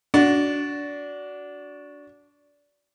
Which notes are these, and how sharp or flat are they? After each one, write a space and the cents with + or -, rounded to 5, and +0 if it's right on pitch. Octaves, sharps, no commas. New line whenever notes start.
D4 -20 F#4 +0